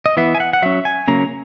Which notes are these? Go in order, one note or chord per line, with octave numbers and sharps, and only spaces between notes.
D#5
E3 B3 E5
G#5
F#5
F#5
F#3 C#4 E5
G#5
C#3 F#3 A#3 C#4 A#5